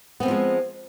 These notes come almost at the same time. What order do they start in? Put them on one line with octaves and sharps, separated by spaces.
B3 C4 A3 F3 G#3